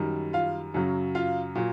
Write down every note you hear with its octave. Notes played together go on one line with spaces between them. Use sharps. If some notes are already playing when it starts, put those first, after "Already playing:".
Already playing: F#2 D#3 G3
F4 F5
F#2 C#3 F#3
F4 F5
A#2 F#3